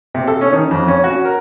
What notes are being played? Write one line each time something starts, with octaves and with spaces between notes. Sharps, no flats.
C3
A4
C#4
D#3
F2
C#4
F#4
A#4